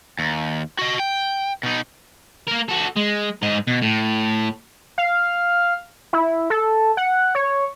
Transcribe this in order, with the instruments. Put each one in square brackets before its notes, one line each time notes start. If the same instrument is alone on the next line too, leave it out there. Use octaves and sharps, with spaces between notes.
[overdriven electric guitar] D#2
F#4 D#5
G5
B2 D#4
[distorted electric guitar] A#3 A#4
F#4 A4
G#3
G#2 D#5
B2
A2
[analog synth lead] F5
E4
A4
F#5
C#5